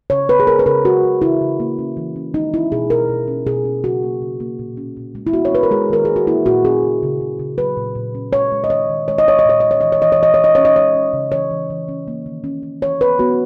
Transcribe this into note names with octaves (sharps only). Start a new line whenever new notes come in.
C#3 C#5
C#3 B4
G#4
G#3 A#4
B4
C#3 A#4
G#3 F#4
C#3
C#3 E4
C#3
A#3
C#4
E3
C#4
G#3 D#4
C#4 E4
B2 G#4
B2 A#4
B2
C#4
B2 G#4
C#4
C#3 F#4
A#3
C#3
A#3
A#2
C#4
A#2
G#3
E4
B3 F#4
C#5
B3 B4
A#4
G#3 G#4
D#3 A#4
A#3 G#4
F#4
A#3 E4
A#2 F#4
C#4 G#4
C#3
C#3
C#3
C#3
F#3 B4
A#2
A#2
C#4
G#3 C#5
G#3
D#5
D#3 C#5
D#3
G#3 C#5
D#5
C#4 C#5
D#5
A#2 C#5
G#3 D#5
C#5
E3 D#5
C#5
E3 D#5
C#5
E3 D#5
C#5
C#4 D#5
C#4 C#5
D#5
G#3 C#5
C#4
C#3
E3 C#5
E3
E3
C#4
A#3
D#3
C#4
C#4
E3 C#5
B3 B4
B3 F#4